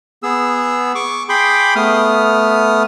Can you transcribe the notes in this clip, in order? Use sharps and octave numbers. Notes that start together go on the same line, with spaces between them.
B3 G#4 E6
C#6 D6
G#4 G5 B5 C6 D6
A3 B3 D#6 F6